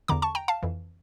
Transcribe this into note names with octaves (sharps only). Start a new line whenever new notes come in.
E2 D3 A#5 D6
A5 C#6
G5 A#5
F5 A5
F2 E3